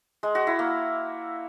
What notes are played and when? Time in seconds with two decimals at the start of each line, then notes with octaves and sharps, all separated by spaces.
0.23 G#3
0.35 F#4
0.47 E4
0.59 A#3